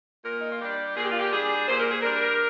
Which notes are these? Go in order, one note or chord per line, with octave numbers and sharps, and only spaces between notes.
A#2 A#4
D#4
F4
G3 D4 G4
A#2 G#4
G4
F4
G4
G3 D4 G#4
A#2 C5
A#4
G#4
G3 D4 A#4